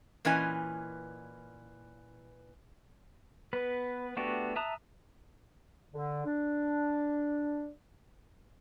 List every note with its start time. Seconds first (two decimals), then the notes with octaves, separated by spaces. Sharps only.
0.25 A#2 E3 C#4 B4 D#5 G#5
3.53 B3 B4
4.17 A3 B3 D4 F#4 G4
4.56 E5 A5 A#5 D#6 F#6
5.94 D3
6.26 D4